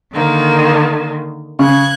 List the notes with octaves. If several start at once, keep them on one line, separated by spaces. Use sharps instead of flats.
D3 D#3 A#3
C#3 F#6 G#6